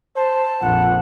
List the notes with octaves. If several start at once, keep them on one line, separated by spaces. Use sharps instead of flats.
C5 A5
A#1 F2 F#5